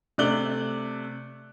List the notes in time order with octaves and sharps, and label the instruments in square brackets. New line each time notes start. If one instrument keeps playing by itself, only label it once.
[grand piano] C3 A3 D5 F#6 F#7 G7